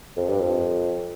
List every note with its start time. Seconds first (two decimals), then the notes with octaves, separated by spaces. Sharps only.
0.16 F2
0.28 G2
0.40 F2